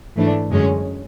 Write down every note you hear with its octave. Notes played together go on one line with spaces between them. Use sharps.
G#2 E3 A3 D4
F#2 D3 G#3 C#4